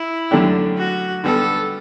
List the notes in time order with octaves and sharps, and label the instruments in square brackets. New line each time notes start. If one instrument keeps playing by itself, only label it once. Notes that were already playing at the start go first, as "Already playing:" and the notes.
Already playing: [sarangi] E4
[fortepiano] F#2 D3 A3 D4 G4
[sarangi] F#4
[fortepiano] D3 G3 B3 [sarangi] A4